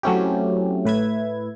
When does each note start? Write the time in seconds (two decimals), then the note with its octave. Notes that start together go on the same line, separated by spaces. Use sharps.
0.03 F#3 A3 C4 C#4 E4 G4
0.85 A2 B4 E5 G#6